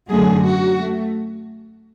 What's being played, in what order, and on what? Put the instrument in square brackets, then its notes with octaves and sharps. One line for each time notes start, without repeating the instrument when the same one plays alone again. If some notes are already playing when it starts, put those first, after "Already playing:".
[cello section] F#2 D3 F#3 A3 G#4
F#4
A3